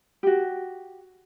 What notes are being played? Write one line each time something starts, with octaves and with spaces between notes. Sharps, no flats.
F#4 G4